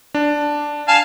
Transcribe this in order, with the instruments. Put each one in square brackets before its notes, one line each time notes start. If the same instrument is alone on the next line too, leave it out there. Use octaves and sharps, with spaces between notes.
[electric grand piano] D4
[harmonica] F5 G#5 A5